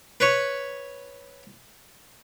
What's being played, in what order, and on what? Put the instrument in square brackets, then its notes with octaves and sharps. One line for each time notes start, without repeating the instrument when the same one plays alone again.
[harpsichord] B4 C#5